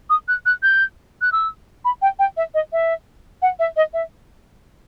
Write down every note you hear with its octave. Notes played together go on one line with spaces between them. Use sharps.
D#6
F#6
F#6
G6
F#6
E6
B5
G5
G5
E5
D#5
E5
F#5
E5
D#5
E5